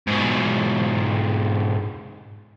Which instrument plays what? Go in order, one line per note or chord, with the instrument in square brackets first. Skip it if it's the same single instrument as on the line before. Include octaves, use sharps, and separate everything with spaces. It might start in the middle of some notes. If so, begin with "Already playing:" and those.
[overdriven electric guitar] G#2 B2